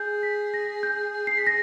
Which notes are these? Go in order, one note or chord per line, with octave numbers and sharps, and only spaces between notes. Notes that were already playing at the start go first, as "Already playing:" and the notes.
Already playing: G#4 G6
B6
A#6
G6
C7
B6
A#6